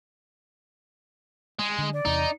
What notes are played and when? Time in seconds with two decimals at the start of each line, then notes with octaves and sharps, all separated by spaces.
1.59 G#3
1.78 D3
1.93 D5
2.05 E2 C3 D#4